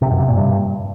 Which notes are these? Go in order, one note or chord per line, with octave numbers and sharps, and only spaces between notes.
C3
F#2
C3
A#2
G2